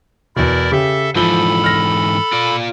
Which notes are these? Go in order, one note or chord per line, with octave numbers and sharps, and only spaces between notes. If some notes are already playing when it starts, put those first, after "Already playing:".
E2 B2 E4 A#4 D5
C#3 G4 A4 E5
G#2 E3 F3 A4 B5 G7
F6 A#6
F4 D5